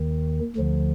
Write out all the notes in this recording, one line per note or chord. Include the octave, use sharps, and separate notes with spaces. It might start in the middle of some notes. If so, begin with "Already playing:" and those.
Already playing: D#2 D#3
D2 D3 F3